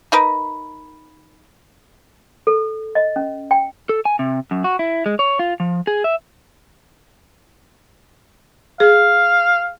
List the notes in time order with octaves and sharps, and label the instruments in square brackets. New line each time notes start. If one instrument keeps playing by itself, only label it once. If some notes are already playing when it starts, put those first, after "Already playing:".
[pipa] D#4 A#4 B4
[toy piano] A4
D#5
C#4
G5
[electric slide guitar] A4
G#5
C3
F#2
F#4
E4
G#3
C#5
F4
F3
G#4
E5
[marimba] G#4 [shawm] F5